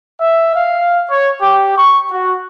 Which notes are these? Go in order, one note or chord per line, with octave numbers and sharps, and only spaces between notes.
E5
F5
C#5
G4
C#6
F#4